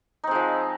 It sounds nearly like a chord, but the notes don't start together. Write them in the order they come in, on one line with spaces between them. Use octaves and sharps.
D#4 C4 G#3 F3